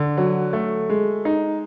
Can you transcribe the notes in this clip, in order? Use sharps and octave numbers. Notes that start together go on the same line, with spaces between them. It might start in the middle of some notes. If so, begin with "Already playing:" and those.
Already playing: D3
F#3
A3
G#3
D#4